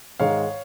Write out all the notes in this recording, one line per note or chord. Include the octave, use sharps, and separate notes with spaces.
G#2 D#3 G#3 C#5 F5